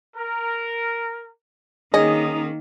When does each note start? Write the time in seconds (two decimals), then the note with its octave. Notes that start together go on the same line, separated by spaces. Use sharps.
0.16 A#4
1.94 D#3 A#3 C#4 G#4 D#5 A#5 D#6